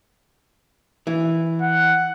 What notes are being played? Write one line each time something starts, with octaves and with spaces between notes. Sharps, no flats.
E3
F#5